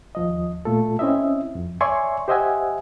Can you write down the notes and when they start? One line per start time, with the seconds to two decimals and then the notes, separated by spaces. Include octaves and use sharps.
0.15 D#2 F3 D#5
0.65 A#2 A3 F4 A4
0.99 C4 C#4 E4 D#5 E5
1.55 F2
1.81 C#5 D5 E5 G#5 C6 C#6
2.28 G4 C5 D#5 E5 F#5 G#5